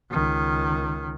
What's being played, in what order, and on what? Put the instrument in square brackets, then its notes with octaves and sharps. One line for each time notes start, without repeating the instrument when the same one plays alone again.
[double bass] C#2 D#3